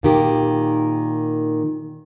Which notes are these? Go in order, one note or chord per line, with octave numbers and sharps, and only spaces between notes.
A#2 D#3 G4